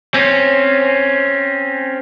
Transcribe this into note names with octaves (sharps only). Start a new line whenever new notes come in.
C4 C#4